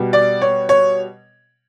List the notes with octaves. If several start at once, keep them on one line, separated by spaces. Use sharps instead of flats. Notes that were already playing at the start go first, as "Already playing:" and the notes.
Already playing: B2 G3
D5
C#5
C#5